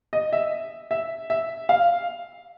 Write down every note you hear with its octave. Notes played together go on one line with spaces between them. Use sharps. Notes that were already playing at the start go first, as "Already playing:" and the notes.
D#5
E5
E5
E5
F5